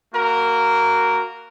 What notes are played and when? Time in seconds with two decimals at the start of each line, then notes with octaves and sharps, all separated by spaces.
0.14 A#3 F#4 A#4